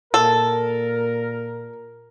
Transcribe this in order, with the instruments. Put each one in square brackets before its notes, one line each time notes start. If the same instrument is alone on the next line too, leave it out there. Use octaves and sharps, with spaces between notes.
[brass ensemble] A#2 A#4 [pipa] A4